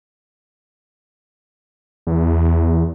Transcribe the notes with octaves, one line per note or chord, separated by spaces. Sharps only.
E2